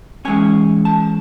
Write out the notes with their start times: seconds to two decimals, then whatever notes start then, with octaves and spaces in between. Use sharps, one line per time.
0.25 E3 G#3 C#4 G#5
0.85 A5